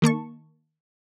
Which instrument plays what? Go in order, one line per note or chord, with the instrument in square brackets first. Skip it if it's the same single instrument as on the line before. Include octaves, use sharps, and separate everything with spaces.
[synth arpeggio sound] D#3 A#3 A5 C#6